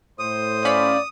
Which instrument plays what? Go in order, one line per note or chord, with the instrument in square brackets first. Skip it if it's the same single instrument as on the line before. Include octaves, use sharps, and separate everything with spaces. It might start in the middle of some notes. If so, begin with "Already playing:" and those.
[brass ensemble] A2 C5 [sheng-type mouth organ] D#6
[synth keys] C#4 F5 B5 [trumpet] D5